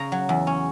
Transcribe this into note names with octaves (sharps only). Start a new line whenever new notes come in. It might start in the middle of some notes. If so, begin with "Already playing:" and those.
Already playing: C#3 A#5
F#3
E2
C#4